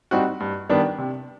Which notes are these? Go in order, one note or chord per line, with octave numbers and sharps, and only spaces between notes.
G3 C4 D#4 F#4
G2
D#3 G3 B3 D4
C3